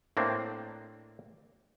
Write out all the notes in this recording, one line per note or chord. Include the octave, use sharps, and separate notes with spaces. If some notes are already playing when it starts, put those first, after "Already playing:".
A2 A#3 C4 D4